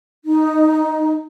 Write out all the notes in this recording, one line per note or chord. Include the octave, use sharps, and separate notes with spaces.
D#4